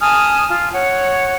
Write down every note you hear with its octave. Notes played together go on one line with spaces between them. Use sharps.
G#5 A5 D#6 F6
F4
C#5 F#5